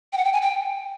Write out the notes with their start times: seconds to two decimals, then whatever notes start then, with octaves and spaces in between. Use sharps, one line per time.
0.13 G5
0.18 F#5
0.25 G5
0.33 G#5
0.42 G5